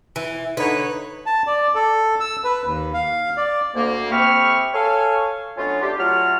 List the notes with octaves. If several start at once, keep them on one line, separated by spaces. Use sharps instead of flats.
E3
D3 D#4 B4 C#5
A5
D5
A4
E6
B4
D#2
F5
D5
D2 A#3
A3 C4 G4 B5 C#6 F6
A4 C#5 F5 G#5
F#3 A3 B3 C#4 D4 F4
A3 D4 G4
F#3 A3 F4 F6